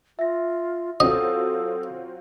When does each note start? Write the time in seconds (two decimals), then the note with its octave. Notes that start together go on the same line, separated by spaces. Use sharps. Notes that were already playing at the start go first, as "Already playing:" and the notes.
0.19 F4 E5 A#6
1.00 F#3 C4 F4 A4 D#5 D#6